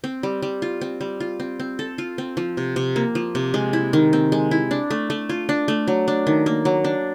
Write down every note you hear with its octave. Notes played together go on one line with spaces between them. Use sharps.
C4
G3
G3
F4
C4
G3
F4
C4
C4
A4
F4
C4
F3
C3
C3
A#3
F3
C3
G#3
E4
D#3
C4
G#3
E4
D4
A3
A3
F4
D4
A3
F#3
D4
D#3
A#3
F#3
D4